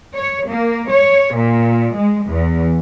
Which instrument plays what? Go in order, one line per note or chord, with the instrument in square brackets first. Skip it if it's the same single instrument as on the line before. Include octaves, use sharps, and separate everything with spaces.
[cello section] C#5
A#3
C#5
A#2
G#3
E2